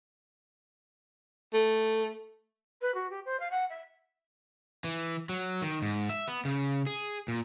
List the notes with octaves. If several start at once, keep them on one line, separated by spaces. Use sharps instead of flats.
A3
B4
F#4
G4
C5
F5
F#5
E5
E3
F#3
D#3
G#2
E5
B3
C#3
G#4
A#2